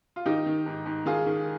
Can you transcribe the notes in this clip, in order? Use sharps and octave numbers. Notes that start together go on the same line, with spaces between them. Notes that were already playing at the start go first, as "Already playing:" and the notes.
F4
D#3 D#4 G4
D#3
G#2
G#2
D#3 F4 G#4
D#3